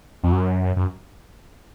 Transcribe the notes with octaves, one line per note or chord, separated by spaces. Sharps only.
F2
F#2
F#2